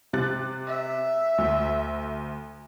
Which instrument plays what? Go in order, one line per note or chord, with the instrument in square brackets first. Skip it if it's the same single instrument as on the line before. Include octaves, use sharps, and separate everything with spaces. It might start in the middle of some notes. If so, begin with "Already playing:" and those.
[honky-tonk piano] C3 F#6 A6
[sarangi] E5
[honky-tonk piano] D2